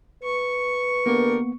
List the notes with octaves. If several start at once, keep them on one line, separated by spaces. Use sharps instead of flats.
B4 C#6
D3 A#3 B3 G4 A#4